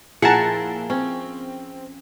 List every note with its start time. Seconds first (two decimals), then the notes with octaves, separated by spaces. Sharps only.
0.22 A#2 F3 E4 G#4 A#4 F#5 A5
0.90 C4 C#4